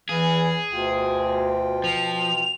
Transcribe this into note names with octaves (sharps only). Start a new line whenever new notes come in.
E2 E3 G#4 F5
D2 B2 F4 G5
F3 F7